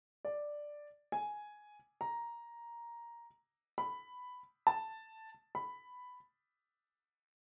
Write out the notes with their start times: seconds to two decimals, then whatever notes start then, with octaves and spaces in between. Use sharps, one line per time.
0.25 D5
1.12 G#5
2.01 A#5
3.78 B5
4.67 A5
5.55 B5